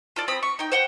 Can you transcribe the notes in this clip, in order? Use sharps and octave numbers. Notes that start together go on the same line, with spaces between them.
F4 A4 D5
C4 B5 D#6
C#6
D#4 G5
C5 F#5 G5